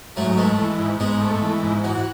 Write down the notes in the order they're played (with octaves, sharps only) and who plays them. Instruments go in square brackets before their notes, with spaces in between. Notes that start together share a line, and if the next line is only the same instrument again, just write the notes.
[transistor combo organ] G#2 [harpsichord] F#3 A3
[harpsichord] G#3 B3 [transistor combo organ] A3
[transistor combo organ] E3
G#2
[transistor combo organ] G#2 [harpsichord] G#3 B3
[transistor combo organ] A3
E3
G#2
[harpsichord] E3 [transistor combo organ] F#4